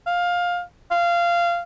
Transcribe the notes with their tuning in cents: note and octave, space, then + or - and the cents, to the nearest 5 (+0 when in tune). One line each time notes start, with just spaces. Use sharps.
F5 +15
F5 -20